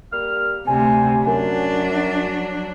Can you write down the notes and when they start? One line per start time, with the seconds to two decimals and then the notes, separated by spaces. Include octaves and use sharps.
0.12 G3 A#3 F6
0.67 D2 C3 G3 G#5
1.26 F#2 F#3 D4